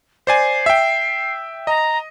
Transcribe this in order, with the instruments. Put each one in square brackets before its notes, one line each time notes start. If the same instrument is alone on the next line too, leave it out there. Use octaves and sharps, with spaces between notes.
[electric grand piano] C5 D5 G#5 [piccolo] C7
[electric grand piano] E5 G5
[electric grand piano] D#5 [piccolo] A#5